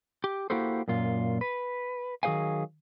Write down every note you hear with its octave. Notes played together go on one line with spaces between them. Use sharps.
G4
A#3 E4 F#4 G4 A4 C5
F#2 A#2 F4
B4
D#3 F#3 G#4 C5 F5 G#5